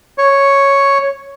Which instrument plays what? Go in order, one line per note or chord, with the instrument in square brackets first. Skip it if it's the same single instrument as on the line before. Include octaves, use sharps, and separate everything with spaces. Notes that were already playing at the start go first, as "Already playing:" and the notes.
[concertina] C#5